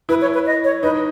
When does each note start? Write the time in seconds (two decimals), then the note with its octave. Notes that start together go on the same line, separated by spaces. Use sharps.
0.09 E4 B4
0.21 C#5
0.34 B4
0.46 D#5
0.64 C#5
0.83 D#4 B4